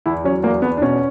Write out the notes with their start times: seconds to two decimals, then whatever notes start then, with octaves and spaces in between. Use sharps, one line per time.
0.06 E2 E4
0.24 F#3 C#4
0.43 E2 A#3
0.62 E2 B3
0.77 D4
0.82 B2 C#4